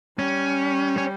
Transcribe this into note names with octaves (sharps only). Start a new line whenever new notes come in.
G3 C#4
C#4